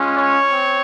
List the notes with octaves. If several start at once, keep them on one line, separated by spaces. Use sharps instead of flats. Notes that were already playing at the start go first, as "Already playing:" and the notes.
Already playing: G#3 C#4 F4
C#5
C4